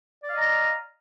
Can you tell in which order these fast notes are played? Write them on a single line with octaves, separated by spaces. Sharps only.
D5 F5 D#5 A#5